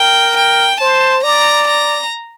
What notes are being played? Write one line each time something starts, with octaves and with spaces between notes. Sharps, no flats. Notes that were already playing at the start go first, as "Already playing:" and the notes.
Already playing: A#4 G5
G5
C5 A5
D5 A#5
A#5